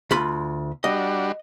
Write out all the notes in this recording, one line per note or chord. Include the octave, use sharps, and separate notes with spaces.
D2 F4 B5
G3 D4 F#4 D#5